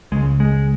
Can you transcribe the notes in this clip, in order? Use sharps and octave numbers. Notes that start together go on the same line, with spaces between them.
C#2 C#3 G#3
G#3